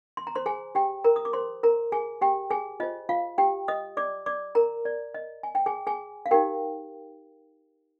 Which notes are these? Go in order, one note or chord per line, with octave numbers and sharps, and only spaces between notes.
C6
A#5
C5 C6
G#4 G#5
G4 G5
A#4 A#5
D#6
D6
C5 C6
A#4 A#5
G#4 G#5
G4 G5
G#4 G#5
F4 C5 D#5
F4 F5
G4 G5
D#5 D#6
D5 D6
D5 D6
A#4 A#5
D5
D#5
G#5
G5
G#4 G#5
G#4 G#5
F5
D#4 G4 A#4 G5